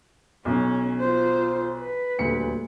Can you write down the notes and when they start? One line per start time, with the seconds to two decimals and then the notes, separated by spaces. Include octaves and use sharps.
0.45 B1 C#4
1.01 F4 C5
1.79 B4
2.19 D#1 D2 C#7